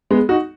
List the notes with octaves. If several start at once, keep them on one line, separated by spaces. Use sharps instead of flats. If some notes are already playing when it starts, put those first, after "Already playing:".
G#3 B3
D#4 F#4